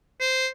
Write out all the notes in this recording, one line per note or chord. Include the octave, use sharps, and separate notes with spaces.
C5